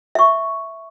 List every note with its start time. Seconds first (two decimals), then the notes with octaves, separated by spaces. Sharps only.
0.15 E5 C#6